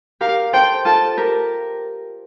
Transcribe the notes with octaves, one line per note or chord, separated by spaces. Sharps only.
G4 A#4 F5
A4 C5 G5
F4 A4 A5
G4 A#4